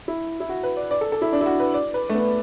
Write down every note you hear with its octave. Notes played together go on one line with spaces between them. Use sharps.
E4
E4
F#4
B4
D5
D5
A4
A4
E4
D4
E4
F#4
B4
D5
B4
A3
B3